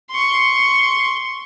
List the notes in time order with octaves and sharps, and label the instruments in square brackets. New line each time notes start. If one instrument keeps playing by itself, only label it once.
[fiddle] C6 C#6